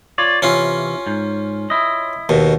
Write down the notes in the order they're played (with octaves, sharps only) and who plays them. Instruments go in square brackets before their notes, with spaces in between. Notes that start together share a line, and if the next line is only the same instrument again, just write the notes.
[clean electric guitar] F4 C#5 D5
[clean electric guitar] C3 E3 [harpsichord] C#4 F4
[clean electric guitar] G#2
E4 D#5
[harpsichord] D#2 B2